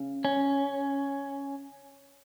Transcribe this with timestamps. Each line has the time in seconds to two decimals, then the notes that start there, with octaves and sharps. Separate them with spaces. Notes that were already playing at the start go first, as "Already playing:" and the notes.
Already playing: C#3
0.25 C#4